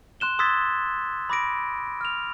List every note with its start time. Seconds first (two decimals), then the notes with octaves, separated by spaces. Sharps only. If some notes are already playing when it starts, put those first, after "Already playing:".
0.20 C6 F#6 E7 G7
0.39 C6 D#6 E6 G#6 A6 B6
1.30 B5 D6 A#6 D7
2.01 F6 F7